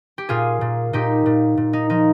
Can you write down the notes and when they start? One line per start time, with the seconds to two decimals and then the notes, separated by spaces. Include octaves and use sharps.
0.18 G4
0.29 A#2 F4 G#4
0.61 A#2
0.93 A#2 D#4 G4
1.26 A#2
1.57 A#2
1.73 D#4
1.90 F3 D#4